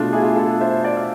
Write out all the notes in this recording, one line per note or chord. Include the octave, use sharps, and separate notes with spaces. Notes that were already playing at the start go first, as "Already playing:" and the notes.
Already playing: B2 A3 D4 F4
E4 G#4
F4
G#4
F4 A4
C5 E5
D5 F5
F5